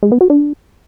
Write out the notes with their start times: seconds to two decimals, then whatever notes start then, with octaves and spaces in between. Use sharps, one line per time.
0.03 G#3
0.12 B3
0.21 F#4
0.30 D4